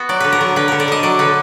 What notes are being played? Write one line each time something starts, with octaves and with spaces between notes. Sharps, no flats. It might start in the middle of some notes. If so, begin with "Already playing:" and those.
Already playing: B3 F#4
F#3 D5
D3 B4
A#4
F#3
D3 B4
D3 A#4
D5
D3 D#5
F#3 D5
D3 B4